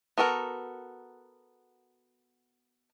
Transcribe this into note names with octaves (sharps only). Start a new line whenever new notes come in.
B3 F#4 A4 A#4